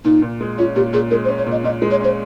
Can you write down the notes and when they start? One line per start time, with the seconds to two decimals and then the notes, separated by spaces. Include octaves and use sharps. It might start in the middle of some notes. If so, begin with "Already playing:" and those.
0.04 A#2 D#4
0.22 A#2
0.41 G#3
0.58 C#4 F4
0.76 A#2 G4
0.93 A#2 G#4
1.11 G#3 A#4
1.25 C5
1.28 C#4
1.38 C#5
1.46 A#2 D#5
1.64 A#2 D#5
1.82 G#3
1.91 C#5
2.00 C#4 C5